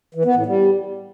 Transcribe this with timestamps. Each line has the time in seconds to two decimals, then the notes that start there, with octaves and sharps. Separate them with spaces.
0.15 E3
0.25 B3
0.36 A2
0.46 G3